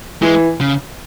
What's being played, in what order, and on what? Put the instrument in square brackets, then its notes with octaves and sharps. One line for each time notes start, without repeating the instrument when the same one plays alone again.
[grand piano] E3 [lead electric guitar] G#3
[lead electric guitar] C#3